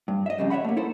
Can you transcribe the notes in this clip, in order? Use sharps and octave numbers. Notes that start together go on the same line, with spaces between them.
G2
D#5 E5
F2 C#3 G3
C#5 D5 E5 F#5 B5
A3 A#3
D#4 E4 A4 C5